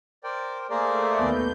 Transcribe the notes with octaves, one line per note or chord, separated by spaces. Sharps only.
A#4 C5 D5 G5
A3 A#3 G#4 A#4 C5 D5
D#2 B3 G6